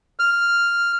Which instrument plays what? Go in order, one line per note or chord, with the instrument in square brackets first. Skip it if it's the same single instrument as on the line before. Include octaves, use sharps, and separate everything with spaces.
[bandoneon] F6